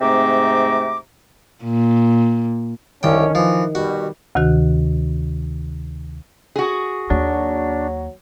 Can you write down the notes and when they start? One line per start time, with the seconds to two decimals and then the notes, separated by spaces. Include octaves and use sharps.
0.01 G#2 C3 A3 C4 A#5 D6
1.64 A#2
3.03 C2 D3 D#3 C#4 G5
3.35 E3 F3
3.75 B2 G3 F#4
4.35 D2 C3 D#3 F#4 F#6
6.56 F#4 G#4
7.10 D#2 F#3 A#3 D4